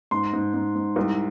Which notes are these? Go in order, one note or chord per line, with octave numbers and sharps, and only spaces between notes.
G#2 C6
G#2
G#2
G#2
C2